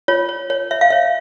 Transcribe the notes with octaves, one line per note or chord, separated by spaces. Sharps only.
F4 C#5
C#5
C#5
C#5 E5
F5
C#5 E5